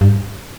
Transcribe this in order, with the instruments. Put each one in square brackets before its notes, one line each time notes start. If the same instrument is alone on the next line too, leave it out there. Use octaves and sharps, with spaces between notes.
[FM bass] G2